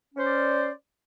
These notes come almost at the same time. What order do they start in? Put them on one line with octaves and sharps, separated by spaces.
C#4 C5 D5